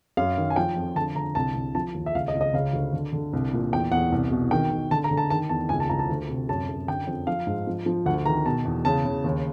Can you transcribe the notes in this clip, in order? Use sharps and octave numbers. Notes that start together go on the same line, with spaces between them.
F#2 F5
D#3
G#5
F3 G5
F2
D3 A5
D3 A#5
C2 A5
C2
F3 A5
D#2
E5
C#2 F5
D#5
C#2
D#5
C#3 F5
D2
D3
D3
C2
A#2
E2 G5
E2 F#5
C2
B2
D#3 G5
D#3
D3 A5
A#5
D3
A5
D#3 A5
E2 A5
C#2 G#5
A5
C#2 A#5
A5
D2
C3
F#2 A5
F#2
D3 G5
F2
F3 F5
G#2
F3
F3
D2 F#5
D#3 A#5
B2 A5
E2
C#3 A5
C#3
D#2